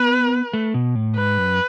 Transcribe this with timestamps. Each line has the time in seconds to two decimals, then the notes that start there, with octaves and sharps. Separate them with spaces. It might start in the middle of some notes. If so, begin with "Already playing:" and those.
Already playing: B3 B4
0.53 A3
0.74 B2
0.95 A2
1.16 G#2 B4
1.38 F#2